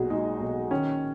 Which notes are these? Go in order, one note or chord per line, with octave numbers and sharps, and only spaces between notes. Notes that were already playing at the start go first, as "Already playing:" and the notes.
Already playing: B1 A#2 F#4 G#4
G#3 D#4
B1
D#3 C#4